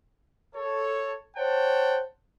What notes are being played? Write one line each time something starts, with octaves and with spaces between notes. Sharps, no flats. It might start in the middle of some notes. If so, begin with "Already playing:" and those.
A4 C#5
C5 C#5 F#5 G5 A5